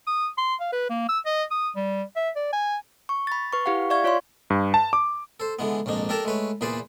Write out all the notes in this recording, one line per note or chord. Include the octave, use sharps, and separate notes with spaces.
D#6
C6
F5
B4
A#3
E6
D#5
D#6
G3
E5
D5
G#5
C#6
B5 A6
B4 C#6
E4 G4 F5 F#5
D5 E5 F5 C#6 G#6
F4 C#5 D5 F5 C6
G2
A5
D6
A4 C5
D3 E3 G#3 B3
A#1 F2 G#2 D4 D#4
D4 G4 A4 A#4 A5 A#5
G#3 A3 B4 C#5
E2 A#2 G#4 B4 C5 D5